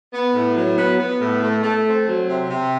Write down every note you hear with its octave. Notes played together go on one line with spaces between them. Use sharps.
B3
A2
F#3
B3
B3
A2
A3
A3
C4
F#3
C3
C3